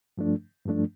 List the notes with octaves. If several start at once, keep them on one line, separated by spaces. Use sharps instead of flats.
G2 F3 A3 D4
G2 F3 A3 D4